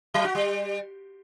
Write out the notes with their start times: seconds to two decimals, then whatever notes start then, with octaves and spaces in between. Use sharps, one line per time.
0.14 F#3
0.25 F#4
0.35 G3